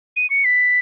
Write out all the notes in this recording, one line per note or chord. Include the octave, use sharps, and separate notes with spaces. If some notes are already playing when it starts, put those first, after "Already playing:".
D#7
C#7
B6